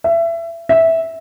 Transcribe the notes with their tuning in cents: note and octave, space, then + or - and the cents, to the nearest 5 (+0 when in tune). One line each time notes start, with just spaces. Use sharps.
E5 +25
E5 -10